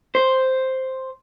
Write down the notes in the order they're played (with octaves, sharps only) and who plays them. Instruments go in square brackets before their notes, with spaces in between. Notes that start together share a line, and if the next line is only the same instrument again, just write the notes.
[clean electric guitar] C5